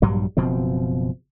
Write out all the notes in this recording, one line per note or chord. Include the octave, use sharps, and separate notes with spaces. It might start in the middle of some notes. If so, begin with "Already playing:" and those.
A#1 G2 F#3 G3
F#1 B2 F3 C4